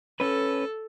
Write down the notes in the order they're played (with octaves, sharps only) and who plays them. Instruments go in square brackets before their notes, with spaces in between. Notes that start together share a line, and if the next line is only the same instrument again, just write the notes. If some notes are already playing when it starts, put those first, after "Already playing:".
[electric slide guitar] C#4 B4 [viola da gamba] A4